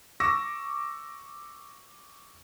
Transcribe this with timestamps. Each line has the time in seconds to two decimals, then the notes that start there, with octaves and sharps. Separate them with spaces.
0.20 C#6 D6 E6 A#6